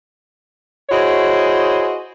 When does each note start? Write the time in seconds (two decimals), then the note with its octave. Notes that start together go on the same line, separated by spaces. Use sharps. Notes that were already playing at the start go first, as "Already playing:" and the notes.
0.90 E4 F#4 G#4 C5 C#5 D#5